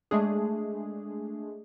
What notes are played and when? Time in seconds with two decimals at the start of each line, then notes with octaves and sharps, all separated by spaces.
0.11 G#3 A3 D4 G#4